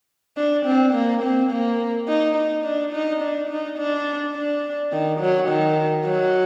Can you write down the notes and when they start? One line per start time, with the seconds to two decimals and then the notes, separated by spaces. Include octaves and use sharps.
0.37 D4
0.65 C4
0.94 A#3
1.22 C4
1.51 A#3
2.07 D#4
2.35 D#4
2.64 D4
2.93 D#4
3.21 D4
3.49 D#4
3.78 D4
4.34 D4
4.92 D#3
5.20 F#3
5.48 D#3
6.05 F#3